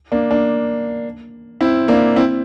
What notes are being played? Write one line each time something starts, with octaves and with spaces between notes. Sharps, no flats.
A#3 D4
A#3 D4
C4 E4
A#3 D4
C4 E4